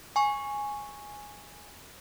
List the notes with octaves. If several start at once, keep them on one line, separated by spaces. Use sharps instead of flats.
G#5 C#6